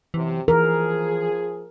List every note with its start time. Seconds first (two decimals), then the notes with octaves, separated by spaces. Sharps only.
0.14 F#2 C3 E3
0.48 E3 F3 G#4 A#4